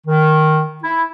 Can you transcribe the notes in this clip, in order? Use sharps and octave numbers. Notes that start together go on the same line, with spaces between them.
D#3
E4